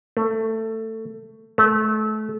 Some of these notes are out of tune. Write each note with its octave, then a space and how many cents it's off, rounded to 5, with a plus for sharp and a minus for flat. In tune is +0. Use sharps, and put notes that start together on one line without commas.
A3 +15
A3 -30